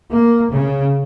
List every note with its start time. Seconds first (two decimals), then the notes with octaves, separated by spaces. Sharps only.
0.12 A#3
0.53 C#3